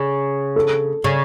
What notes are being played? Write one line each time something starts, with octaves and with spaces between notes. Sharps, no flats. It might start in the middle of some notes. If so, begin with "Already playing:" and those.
Already playing: C#3
A4
C#3